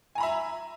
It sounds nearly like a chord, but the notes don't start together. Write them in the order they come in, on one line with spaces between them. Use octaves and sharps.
G#5 A#5 B5 E5